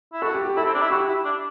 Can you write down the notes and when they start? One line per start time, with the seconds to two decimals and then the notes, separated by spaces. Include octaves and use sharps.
0.13 E4
0.22 F#4 A4
0.34 G4
0.45 G4
0.56 E4 A4
0.65 C4
0.74 D4
0.82 E4
0.91 F#4 G4
1.08 E4
1.25 D4